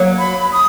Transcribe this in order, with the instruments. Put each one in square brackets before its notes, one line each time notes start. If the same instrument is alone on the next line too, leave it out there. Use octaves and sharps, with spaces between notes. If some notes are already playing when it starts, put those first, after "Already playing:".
Already playing: [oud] F#3 A#3
[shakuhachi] B5
D#6